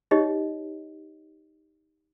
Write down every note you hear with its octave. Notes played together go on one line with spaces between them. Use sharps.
D#4 G4 C#5 D#5